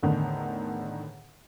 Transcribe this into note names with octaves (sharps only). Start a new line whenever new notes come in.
E2 A2 D3 D#3